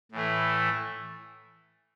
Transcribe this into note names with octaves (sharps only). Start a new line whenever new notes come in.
A2 E3 A3